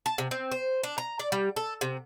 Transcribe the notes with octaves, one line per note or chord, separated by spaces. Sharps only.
A5
C3
C4
C5
D4
A#5
D5
G3
A4
C3